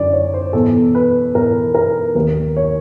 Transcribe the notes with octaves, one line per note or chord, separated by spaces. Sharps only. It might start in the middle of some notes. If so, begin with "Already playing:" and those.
Already playing: F#2 D3 D5
C#5
C5
E2 B2 A4
B4
E2 B2 A#4
A#4
D#2 D#3 A#4
C#5